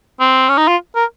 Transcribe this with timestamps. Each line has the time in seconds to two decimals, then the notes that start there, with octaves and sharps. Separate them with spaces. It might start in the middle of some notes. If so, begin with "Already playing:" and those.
0.20 C4
0.49 C#4
0.58 D#4
0.68 F4
0.95 A#4